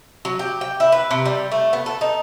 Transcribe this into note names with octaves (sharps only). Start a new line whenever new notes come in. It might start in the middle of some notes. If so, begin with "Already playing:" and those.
F#3
G4
G5
E4
B4
C3
G3
A3
B3
A4
D#4